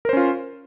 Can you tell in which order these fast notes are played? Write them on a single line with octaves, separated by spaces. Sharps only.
A#4 C5 C#4 F4